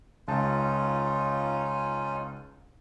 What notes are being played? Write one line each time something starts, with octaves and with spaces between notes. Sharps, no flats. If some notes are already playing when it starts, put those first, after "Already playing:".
C#2 C#4 D#4 F4 A5